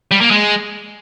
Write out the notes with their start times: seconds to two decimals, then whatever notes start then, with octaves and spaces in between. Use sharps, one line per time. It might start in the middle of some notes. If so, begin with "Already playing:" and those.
0.11 G3
0.21 A#3
0.31 G#3